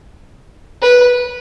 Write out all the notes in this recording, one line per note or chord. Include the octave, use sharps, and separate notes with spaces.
B4